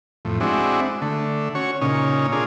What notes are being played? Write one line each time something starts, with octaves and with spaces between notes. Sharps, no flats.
F2 A2
G#3 C4 D4 E4 F#4
D3 A3
C#4 F#4 C#5
A#2 C#3 C#4 D#4
A#3 D4 F4 G#4